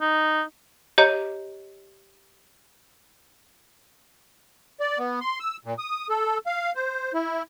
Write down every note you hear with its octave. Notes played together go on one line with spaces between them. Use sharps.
D#4
G4 C#5 D#5 A#5
D5
B3
C6
E6
A#2
D#6
A4
F5
C5
E4